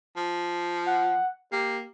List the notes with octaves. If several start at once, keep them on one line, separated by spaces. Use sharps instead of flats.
F3
F#5
A#3 G4